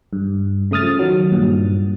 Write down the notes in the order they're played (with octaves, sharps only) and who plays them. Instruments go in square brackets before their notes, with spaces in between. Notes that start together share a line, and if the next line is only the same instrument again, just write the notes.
[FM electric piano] G2
C#3 A3 D#6 F6 A6
F3
D#3 F#3
G2 A#2